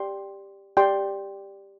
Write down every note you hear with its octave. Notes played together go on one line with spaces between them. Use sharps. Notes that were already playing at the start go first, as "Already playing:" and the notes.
Already playing: G4 D5 G5 C6
G4 D5 G5 C6